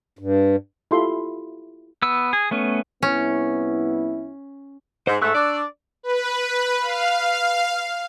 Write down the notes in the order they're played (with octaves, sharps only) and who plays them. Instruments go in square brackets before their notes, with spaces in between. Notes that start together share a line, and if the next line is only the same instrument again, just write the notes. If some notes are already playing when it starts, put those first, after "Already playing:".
[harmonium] G2
[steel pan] E4 F4 G4 A4 E5 C6
[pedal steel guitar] B3 E6
G#4
A3 B3 C#4
[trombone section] C2 B3 E4 [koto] C#4
[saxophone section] G#2 [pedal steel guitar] C5
[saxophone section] G#2 A3 [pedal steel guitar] C#6 E6 F#6
[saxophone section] D4 D5
[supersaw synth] B4
F5